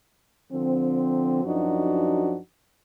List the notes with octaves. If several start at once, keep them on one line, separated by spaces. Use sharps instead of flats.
D3 F3 C4
F#2 F3 D4 D#4 F#4